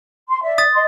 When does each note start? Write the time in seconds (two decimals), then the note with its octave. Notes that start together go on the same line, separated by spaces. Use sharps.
0.29 C6
0.43 D5 E5
0.58 D#6 A6
0.75 D#5 C6